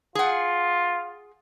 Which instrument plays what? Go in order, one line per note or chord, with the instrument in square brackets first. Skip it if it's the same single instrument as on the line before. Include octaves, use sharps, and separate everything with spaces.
[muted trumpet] F4 [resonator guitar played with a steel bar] G#4 F#5